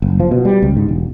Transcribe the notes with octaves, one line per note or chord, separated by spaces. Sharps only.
F#1
F3
B2
G3
C#2
G#2
E1